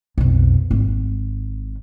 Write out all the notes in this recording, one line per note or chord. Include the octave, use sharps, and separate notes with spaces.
B1 F2
G#1